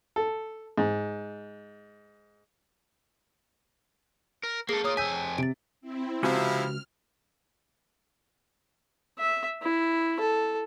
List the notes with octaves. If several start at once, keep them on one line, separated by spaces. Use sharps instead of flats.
A4
G#2
A#4
A#3 G#4 A4 A#6 C7
A#3 F4 C#5 D#6
F2 G#5 E6 G6 B6 D#7
C3 A6 D7
C4 E4
C#2 C3 F3 E4 F#4 G#5 F6
E5
E4
A4